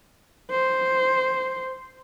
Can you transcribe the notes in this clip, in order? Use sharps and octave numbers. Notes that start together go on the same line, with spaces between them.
C5